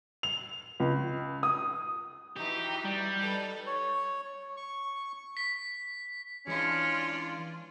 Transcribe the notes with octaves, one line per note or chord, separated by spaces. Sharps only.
F7
C#2
D#6
E3 D#4 F#4 G4
G3
D#4 A4 B4
C#5
C#6
B6
E3 G#3 C#4 D4 F4 D5